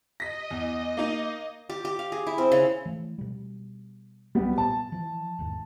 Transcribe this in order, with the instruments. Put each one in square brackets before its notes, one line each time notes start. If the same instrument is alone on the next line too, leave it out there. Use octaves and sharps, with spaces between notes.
[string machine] D#5 [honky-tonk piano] A#6 B6
[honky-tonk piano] E2
A#3 D#4 D#7
[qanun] G4
G4
F5
G#4
E4
C4
C#3
[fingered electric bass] E3 A3
B2 G3
[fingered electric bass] B1 F#3 [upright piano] G3 B3 G4
[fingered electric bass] A#2 [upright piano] A5
[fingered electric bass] E3 F3
G#1 E2 D#3